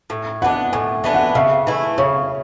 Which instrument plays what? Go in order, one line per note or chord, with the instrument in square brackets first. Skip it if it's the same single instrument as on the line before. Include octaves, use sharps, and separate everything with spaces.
[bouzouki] A2
[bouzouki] E3 B3 D4 [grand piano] F#5
[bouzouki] A2 [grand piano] G#5
[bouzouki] E3 B3 D4
[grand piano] F#5
[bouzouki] C#3 [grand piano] E5
[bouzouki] E3 A3 E4
[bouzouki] C#3 [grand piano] C#5